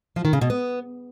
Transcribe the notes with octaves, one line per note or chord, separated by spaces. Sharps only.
F3
D#3
C#3
B2
B3